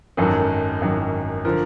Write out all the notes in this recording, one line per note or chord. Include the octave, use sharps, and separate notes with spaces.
G#1 F#2 D#3 F#3 A4
G#1 F#2 D#3 F#3
D3 F3 A#4